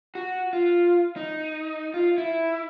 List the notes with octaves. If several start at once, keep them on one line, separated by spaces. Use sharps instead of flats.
F#4
F4
D#4
F4
E4